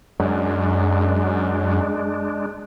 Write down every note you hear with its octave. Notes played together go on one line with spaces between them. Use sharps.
F#2 G#3 D4